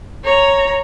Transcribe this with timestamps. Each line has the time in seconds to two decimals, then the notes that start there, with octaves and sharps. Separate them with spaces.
0.24 C#5 A#5